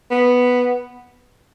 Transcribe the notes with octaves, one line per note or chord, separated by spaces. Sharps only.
B3